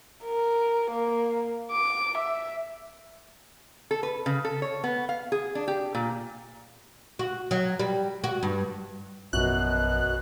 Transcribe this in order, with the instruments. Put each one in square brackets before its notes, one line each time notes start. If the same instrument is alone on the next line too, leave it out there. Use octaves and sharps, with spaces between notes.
[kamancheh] A#4
A#3
D6
E5
[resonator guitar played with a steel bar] A4
B4
C#3
A4
C#5
B3
F5
G#4
D4
G4
A#2
[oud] F#4
F#3
G3
F#4
G2
[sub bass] A#1 [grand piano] F#2 F#4 [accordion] B2 [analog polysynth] F#6